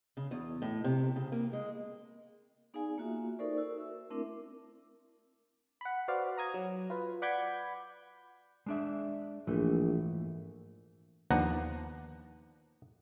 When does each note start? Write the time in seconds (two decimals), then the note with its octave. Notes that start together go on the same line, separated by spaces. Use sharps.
0.17 C#3
0.31 E2
0.62 A2
0.84 C3
1.16 C#3
1.32 A#3
1.53 G#3
2.74 B3 D#4 G#4 D5 F5 G#5
2.98 A#3 F4 F#4 E5
3.39 D#4 A4 A#4 C5 D5 C#6
3.57 F#4 A#4 E6
3.78 E5
4.10 A3 C4 D4 E4 A#4 D6
5.81 F#5 B5
6.08 F#4 B4 C5 D5 F5
6.37 A#5 D#6 G#6
6.54 F#3
6.90 F4 B4
7.22 D5 F#5 B5 D6 G6 G#6
8.66 G#3 D4 E5
9.47 A#1 G#2 E3 A3
11.31 D#2 F3 B3 D4 F#5 A#5